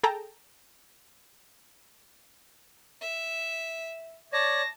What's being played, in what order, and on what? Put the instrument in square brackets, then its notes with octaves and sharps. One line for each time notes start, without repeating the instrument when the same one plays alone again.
[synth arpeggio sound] G#4 A4 G5 A5 A#5
[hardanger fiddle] E5
[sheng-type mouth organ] C#5 D5 [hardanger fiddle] A5 [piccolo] A#6